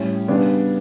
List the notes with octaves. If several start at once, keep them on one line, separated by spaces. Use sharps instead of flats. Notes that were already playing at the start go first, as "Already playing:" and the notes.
Already playing: A2 G3 C#4
C#3 G3 B3 D4